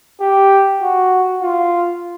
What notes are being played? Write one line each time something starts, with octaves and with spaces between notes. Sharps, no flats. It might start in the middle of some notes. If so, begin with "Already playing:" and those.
G4
F#4
F4